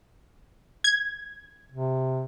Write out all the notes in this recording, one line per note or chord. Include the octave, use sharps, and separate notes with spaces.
G#6
C3